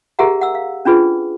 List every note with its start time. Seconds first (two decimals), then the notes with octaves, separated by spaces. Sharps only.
0.19 G4 G#4 A#4 E5 F#5 A#5
0.41 F#5 E6
0.55 F5
0.85 C#4 D4 F4 G#4 B4